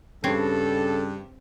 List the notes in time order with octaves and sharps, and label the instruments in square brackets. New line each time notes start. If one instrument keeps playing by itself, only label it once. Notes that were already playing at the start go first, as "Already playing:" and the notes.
[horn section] G2 [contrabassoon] C#3 [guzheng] C4 C#5 [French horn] A4